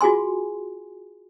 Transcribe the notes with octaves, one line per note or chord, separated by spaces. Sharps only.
F4 F#4 G#4 G#5 C6